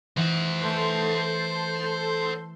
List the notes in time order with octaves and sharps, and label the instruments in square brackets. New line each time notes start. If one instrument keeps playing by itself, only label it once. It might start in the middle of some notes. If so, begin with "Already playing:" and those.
[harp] E3 [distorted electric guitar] C5 F#5
[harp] A3 B4 [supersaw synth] A4 C6 G6